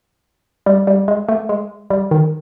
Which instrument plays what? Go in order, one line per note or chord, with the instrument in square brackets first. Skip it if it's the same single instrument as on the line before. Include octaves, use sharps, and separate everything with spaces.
[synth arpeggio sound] G3
G3
G#3
A3
G#3
G3
D#3